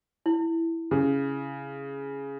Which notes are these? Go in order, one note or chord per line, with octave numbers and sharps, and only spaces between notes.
E4
C#3